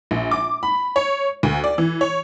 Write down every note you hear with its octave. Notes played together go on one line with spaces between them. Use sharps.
A#1
D6
B5
C#5
D2
D5
E3
C#5